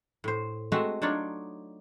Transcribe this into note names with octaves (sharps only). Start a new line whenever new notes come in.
A2 C5
G#3 A3 C4 F#4 E5
F#3 D4 D#4 F4 C#5 D5